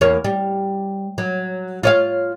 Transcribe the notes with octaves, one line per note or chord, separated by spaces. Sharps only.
E2 A#3 C#5
G3
F#3
F4 C#5 F5